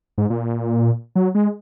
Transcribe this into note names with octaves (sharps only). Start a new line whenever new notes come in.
G#2
A#2
F#3
G#3